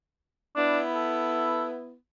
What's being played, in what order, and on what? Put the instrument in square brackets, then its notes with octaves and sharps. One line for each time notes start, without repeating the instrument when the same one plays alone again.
[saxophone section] B3 E4 [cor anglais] D4
[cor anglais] A4